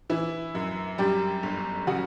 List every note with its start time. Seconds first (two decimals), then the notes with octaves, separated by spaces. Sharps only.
0.10 E3 E4
0.55 F#2
0.98 F#2 G3 G4
1.43 G1
1.87 C#3 F#3 F#4